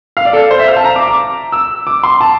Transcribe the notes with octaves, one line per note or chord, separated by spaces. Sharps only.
F5
D5
A4
C5
E5
F5
A5
A#5
D6
D6
E6
D6
C6
A5